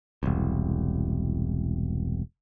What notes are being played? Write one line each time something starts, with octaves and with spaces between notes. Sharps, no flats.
E1 C2